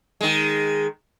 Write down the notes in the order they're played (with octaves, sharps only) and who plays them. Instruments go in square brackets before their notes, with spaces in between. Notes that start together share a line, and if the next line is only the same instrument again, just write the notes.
[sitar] D#3 G#3